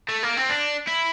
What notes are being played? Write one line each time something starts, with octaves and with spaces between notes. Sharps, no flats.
A3
A#3
C4
D4
E4